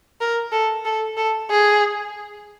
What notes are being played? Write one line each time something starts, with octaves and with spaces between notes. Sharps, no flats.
A#4
A4
A4
A4
G#4